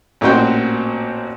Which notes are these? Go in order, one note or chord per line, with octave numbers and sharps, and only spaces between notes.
A1 A#2 C4 F#4 C5 G5